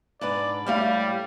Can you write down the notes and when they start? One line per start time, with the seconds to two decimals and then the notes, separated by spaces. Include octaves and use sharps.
0.21 G#2 D4 B4 D5
0.66 A2 G3 A3 F5